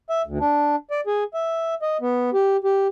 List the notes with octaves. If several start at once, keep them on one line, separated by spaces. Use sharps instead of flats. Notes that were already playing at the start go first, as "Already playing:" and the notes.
E5
D2
D4
D5
G#4
E5
D#5
B3
G4
G4